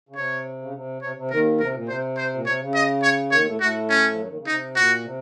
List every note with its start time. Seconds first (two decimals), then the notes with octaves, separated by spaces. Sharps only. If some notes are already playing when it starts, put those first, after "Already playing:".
0.09 C#3
0.16 C3 C#5
0.62 C#3
0.74 C3
1.02 C3 C#5
1.16 C3
1.31 D#2 D#3 A#4
1.59 C3 A#4
1.74 A#2
1.88 C3 C5
2.17 C5
2.34 A#2
2.45 C3 C#5
2.60 C#3
2.74 D#5
3.03 C#5
3.32 D#2 D#3 C#5
3.46 A2 A3
3.61 A2 A3 F#4
3.89 C#4
4.12 F3
4.18 F#2 F#3
4.27 D#2 D#3
4.37 C#3
4.46 C3 D#4
4.76 A#2 F#4
5.04 C3